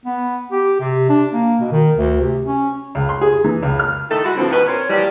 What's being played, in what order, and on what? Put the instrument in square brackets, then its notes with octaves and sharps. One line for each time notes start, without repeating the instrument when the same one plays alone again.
[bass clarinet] B3
G4
C3
D4
A#3
B2
D#3
D2
C3
C#4
[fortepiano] C#2
C6
G#4
E3
C#2
F6
[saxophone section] A2 D#3 A3 D#4 A4
G3 G#3 E4 F#4
A2 D3 F3 F#3 B3 C4
D#2 B2 B4
C4 A#4 C5 C#5
A#2 E3 F3 G3